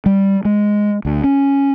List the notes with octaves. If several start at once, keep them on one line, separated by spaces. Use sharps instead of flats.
G3
G#3
D2
C#4